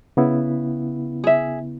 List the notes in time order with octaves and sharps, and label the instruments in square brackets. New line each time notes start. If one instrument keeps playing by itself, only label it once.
[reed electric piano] C#3 B3 E4
[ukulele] G#4 E5